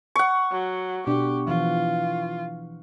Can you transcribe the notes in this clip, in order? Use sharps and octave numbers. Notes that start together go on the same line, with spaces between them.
F#5 C#6
F#3
B2 D4 G4
E3 F3 F4